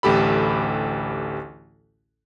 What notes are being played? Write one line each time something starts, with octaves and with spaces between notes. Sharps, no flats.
A1 D2 G4 A4 B5